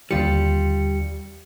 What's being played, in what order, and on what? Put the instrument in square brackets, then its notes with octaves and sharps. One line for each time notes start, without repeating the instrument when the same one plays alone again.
[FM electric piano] D#2 D3 C#7 [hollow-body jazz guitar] G3 F4